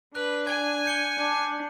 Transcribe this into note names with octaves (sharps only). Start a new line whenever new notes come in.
D4 B4 F#6
G#5 G#6
G6 C#7 G7
D4